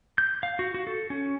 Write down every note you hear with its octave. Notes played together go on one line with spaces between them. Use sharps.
G6
F5
F#4
F#4
A4
C#4